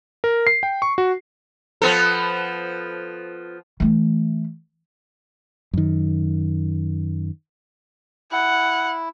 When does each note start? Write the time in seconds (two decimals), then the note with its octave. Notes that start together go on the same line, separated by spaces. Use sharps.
0.24 A#4
0.47 C7
0.63 G5
0.82 C#6
0.98 F#4
1.82 F3 B3 A4
3.80 E3 A3
5.73 F#2 D#3
8.32 E4 F#5